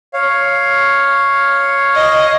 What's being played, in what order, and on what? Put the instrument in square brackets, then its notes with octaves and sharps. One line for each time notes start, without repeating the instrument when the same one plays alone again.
[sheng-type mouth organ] C#5 F5
[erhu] D#5